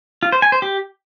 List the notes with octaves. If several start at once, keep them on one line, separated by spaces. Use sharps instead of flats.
F4
C5
G#5
C5
G4